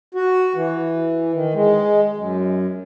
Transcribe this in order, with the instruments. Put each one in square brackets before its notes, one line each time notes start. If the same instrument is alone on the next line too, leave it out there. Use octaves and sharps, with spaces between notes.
[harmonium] F#4
E3
D#3
G#3
F#2